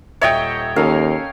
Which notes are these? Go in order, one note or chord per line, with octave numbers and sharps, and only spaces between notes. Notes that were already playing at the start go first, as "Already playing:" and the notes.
D#1 C#5 D#5 E5 G5 A6
D#2 C#4 A4 A#4 F5